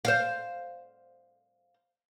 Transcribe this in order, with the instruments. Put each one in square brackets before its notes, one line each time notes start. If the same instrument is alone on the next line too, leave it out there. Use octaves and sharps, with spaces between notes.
[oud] C5 F5